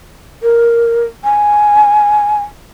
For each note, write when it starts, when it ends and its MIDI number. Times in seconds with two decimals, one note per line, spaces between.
0.43 1.04 70
1.24 2.38 80